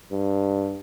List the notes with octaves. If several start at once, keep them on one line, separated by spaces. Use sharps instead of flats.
G2